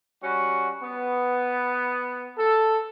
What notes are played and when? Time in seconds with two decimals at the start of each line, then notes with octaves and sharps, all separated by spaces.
0.22 G3 C#4 F#4
0.82 B3
2.38 A4